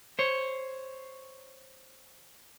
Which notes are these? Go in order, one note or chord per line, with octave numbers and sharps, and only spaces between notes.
C5 C#5